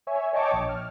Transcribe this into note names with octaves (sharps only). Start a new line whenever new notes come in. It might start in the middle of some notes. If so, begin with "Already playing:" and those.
C#5 E5 G#5
C#5 D#5 G5 A5 C#6 D6
A#1
F6